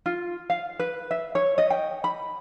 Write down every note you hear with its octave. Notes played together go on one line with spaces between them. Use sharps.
F4
F5
B4
E5
C#5
D#5
G5
B5